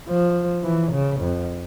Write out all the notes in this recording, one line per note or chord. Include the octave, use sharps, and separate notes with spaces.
F3
E3
C#3
F2